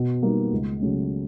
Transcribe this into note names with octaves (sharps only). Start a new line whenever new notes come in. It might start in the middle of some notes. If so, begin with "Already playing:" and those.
Already playing: B2
G3 A#3 D#4
C#2
C#3 F#3 A3 C#4